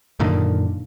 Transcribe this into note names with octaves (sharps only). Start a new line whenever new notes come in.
F#2 A#2 D3 D#3